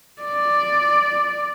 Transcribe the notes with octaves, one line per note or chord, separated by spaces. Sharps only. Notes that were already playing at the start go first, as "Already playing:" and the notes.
D5